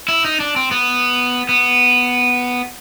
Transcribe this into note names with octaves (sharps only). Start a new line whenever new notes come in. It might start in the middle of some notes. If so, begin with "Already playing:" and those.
E4
D#4
D4
C4
B3
B3